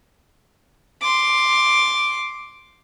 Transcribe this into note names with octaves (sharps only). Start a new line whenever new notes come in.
C6 D6